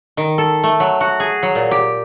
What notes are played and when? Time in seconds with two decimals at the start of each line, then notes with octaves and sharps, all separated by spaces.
0.17 D#3
0.38 A4
0.64 A3
0.80 F#3
1.01 F#4
1.20 G#4
1.43 F#3
1.55 A#2
1.71 G4